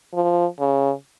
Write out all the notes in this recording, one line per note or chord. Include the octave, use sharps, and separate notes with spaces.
F3
C#3